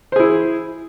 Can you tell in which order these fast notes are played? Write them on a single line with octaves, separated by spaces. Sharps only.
C5 G#4 E4